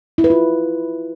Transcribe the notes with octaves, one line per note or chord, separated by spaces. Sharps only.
E4
B4
F4